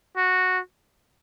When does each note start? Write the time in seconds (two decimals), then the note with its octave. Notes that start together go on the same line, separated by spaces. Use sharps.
0.17 F#4